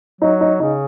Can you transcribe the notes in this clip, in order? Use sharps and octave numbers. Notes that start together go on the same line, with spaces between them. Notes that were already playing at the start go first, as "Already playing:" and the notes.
F#3 D#4
D#4
C#3 D#4